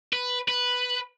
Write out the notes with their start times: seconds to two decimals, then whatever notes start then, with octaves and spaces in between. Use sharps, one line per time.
0.13 B4
0.48 B4